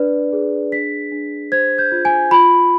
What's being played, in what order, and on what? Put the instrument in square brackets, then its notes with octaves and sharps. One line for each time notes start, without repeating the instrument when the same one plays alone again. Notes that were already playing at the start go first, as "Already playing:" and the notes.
Already playing: [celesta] D4 B4 D5
G#4
D4 B6
D4
C5 G#6
G6
F4
G#5
F4 B5